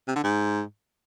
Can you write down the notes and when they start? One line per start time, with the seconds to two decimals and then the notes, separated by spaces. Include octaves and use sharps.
0.08 C3
0.16 D3
0.24 G#2